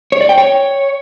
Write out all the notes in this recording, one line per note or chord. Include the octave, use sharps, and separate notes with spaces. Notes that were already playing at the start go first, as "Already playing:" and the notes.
C#5
D5
G5
C#5